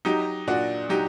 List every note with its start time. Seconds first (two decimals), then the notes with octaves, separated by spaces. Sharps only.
0.05 F#3 D#4 G4
0.47 A#2 D4 F#4
0.89 F#3 D#4 G4